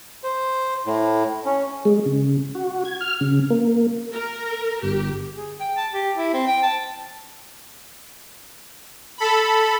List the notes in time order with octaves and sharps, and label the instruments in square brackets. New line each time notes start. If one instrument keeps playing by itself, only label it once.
[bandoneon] C5
A2
C#4
[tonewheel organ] G#3
C#3
F#4
G#6
F6
C#3
A#3
[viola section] A#4
[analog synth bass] G1 [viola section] G4
[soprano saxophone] G#4
G5
A5
G4
E4
C4
G5
A5
[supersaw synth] A4 B5